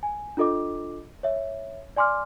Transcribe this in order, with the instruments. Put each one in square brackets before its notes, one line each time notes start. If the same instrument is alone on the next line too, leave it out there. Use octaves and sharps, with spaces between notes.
[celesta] G#5
D4 F4 A4 D#5 D6
C#5 E5
D5 G#5 C6 D6 F6